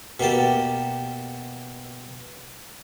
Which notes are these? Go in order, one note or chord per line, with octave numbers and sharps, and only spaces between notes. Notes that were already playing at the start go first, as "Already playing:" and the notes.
B2 A#3 G4 A5